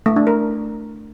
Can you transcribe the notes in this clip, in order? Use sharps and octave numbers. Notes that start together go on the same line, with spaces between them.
A3
D4
A#4